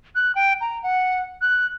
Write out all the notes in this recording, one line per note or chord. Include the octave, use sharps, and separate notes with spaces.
F#6
G5
A#5
F#5
F#6